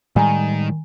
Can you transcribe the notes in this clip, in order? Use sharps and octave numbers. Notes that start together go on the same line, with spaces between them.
A2 D#3 G3 G#3 G#5 A#5